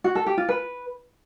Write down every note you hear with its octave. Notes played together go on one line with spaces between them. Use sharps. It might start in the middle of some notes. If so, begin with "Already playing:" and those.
F#4
A4
G4
F4
B4